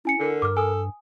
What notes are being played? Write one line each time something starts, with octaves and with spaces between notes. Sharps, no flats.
C#4 E4 G#5 C#7
D3 A#4
G2 D6 F6
A4 G#5 D#6